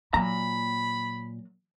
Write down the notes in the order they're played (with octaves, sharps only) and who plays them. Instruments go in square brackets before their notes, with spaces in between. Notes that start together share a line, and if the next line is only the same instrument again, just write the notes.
[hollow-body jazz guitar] A#2 A#5 [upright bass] F#3 [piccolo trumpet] B5